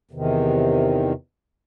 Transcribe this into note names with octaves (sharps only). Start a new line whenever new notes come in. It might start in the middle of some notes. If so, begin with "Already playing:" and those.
E2 C3 D#3